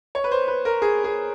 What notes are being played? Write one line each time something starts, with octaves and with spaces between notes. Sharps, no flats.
C#5
B4
C5
B4
A#4
G#4
G#4